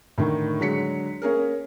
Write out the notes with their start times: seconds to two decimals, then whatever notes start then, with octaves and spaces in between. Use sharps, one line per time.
0.18 A2 D3 D#3
0.60 D3 F#3 G#3 B6 C#7
1.22 A#3 C#4 G#4 A#4